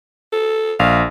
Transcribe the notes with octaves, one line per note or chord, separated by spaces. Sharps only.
A4
A#1 F5